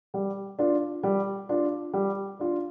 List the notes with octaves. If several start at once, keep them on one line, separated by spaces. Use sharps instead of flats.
G3
D4 F4
G3
D4 F4
G3
D4 F4